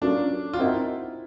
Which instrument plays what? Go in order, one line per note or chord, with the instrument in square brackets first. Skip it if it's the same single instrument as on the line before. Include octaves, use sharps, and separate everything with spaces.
[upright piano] F#3 A#3 C#4 F4 A4 [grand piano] D4
[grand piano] F4
[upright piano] C4 D#4 F#4 A#4 [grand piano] E4